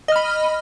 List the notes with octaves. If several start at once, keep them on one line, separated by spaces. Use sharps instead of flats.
D#5 B5 F6